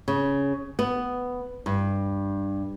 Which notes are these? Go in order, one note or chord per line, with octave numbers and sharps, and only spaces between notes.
C#3
B3
G2